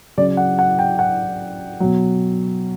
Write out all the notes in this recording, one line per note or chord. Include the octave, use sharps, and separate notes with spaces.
C#3 F#3 D5
F#5
F#5
G5
F#5
B2 F#3